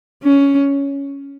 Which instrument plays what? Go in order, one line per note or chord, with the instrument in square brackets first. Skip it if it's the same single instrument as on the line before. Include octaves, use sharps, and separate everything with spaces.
[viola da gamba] C#4